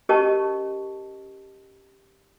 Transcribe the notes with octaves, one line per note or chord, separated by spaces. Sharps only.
C#4 G4 A#4 D#5 A5 C#6